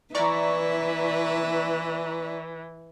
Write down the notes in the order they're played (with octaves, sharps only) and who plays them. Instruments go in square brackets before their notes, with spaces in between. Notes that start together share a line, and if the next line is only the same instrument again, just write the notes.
[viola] E3 [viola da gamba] E4 B4 [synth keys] D5 A#5 C#6